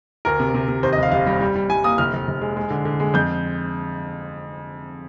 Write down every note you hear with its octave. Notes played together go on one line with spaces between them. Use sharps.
D2 A#4
C3
C3
C3
D#2 C5
D#5
F1 F5
F1 F5
G3
G3
G3
G3 G#5
A#3 D#6
F1 F6
F1
F1
G#3
G#3
D3
D3
G#3
F2 G6